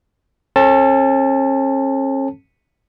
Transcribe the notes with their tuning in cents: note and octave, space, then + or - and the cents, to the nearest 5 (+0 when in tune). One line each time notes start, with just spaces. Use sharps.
C#4 -40 A4 -15 A5 +0